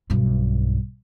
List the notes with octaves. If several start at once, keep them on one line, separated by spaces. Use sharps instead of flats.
B1 G2